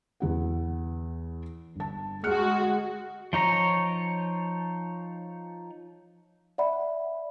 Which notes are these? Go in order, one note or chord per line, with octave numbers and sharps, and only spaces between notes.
E2 E4 F#5
G1 A5
G#3 F#4 F6 F#6 C#7
F3 D#4 C#5 A#5
D5 E5 F#5 B5